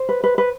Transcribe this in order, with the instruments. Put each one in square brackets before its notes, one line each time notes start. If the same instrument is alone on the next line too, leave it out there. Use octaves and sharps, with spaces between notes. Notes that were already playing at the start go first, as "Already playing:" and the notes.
Already playing: [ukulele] C5
B4
B4
B4